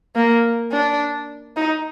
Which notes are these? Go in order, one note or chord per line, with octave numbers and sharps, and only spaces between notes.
A#3
D4
D#4